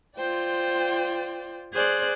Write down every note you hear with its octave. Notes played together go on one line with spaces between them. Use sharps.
F4 C5 D5 G5
G#4 C5 D5 F#6